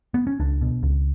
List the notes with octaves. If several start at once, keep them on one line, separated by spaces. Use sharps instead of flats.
B3
C#4
C#2 D4
B2
C#2